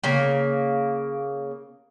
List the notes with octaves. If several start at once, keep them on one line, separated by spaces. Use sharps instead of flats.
C#3 A#3